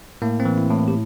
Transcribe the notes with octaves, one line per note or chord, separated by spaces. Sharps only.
A2 A#3
C4
E3
E4
A2
G4